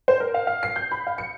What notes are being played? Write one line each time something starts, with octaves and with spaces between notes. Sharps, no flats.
C5
A#4
F5
F5
C7
G6
B5
F5
C#7